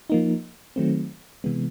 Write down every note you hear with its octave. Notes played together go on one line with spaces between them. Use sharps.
F3 A#3 D#4
D#3 F#3 A3 C4
C3 E3 G#3 B3